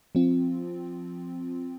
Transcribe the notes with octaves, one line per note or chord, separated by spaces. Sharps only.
F3 C4 F4